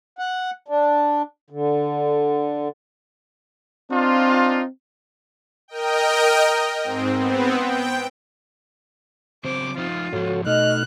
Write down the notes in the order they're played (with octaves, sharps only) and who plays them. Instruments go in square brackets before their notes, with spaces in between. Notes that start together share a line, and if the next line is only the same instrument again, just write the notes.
[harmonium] F#5
D4
D3
[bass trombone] C4 [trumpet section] D4 D#4 F4
[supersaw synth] A#4 D#5 G5
G#2 C4
B3 C4
G5
[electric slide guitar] C#3 F#3 C5 [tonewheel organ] C4 [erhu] D6
[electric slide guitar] F3 D#4 [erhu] F4
[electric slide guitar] G#2 F3 [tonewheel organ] F#4 A4 C#5
[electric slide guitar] B2 [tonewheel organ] A3 D#4 F6 [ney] D#5 [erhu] F#6